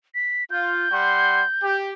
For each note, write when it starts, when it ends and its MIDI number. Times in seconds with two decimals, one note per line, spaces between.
0.15 0.44 95
0.50 0.84 65
0.50 1.76 91
0.92 1.42 55
0.92 1.42 78
0.92 1.42 84
1.63 1.92 67